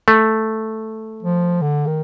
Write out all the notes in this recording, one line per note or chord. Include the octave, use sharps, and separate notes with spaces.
A3
F3
D3
D#3